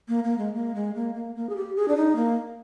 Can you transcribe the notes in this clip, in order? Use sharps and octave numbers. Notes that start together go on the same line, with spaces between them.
A#3
A#3
G#3
A#3
G#3
A#3
A#3
A#3
G#4
G4
G#4
D4
D#4
A#3